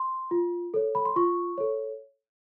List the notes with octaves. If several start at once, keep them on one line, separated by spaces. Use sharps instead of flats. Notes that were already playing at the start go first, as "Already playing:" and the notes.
Already playing: C6
F4
A4 C#5
B5
C6
F4 C#6
A4 C#5